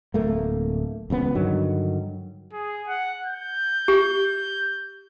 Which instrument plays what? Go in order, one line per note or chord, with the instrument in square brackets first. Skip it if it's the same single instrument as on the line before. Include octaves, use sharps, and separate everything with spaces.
[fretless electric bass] D1 A3 A#3
D#1 C#2 C3 B3
G2 D3 D#3 F#3
[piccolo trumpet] G#4
F#5
G6
[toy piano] G4